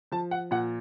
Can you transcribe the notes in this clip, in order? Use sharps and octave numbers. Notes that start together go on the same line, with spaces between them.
F3 A5
F#5
A#2 F#5